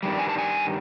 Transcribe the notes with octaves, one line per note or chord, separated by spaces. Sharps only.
G2 D#3 G3
G#5
A5
G#5